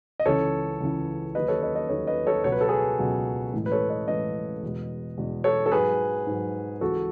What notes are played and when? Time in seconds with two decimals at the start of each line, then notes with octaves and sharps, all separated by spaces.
0.20 D#5
0.26 C#2 C#3 E3 A4 C#5
0.80 C#2 C#3 E3
1.35 D#2 D#3 F#3 B4 D#5
1.48 A4 C#5
1.62 B4 D#5
1.75 B4 D#5
1.89 D#2 D#3 F#3 A4 C#5
2.07 B4 D#5
2.27 A4 C#5
2.44 C#2 B2 F#3 C#5
2.52 B4
2.61 A4
2.68 G#4 B4
2.99 C#2 B2 F#3
3.53 A2 E3 G#3
3.66 B4
3.72 A4 C#5
3.90 B4 D#5
4.08 A2 E3 G#3 B4 D#5
4.62 E2 B2 G#3
5.17 E2 B2 G#3
5.44 A4 C#5
5.66 A4
5.72 G#2 F#3 G#4 B4
6.27 G#2 F#3
6.81 C#2 C#3 E3 G#3 F#4 A4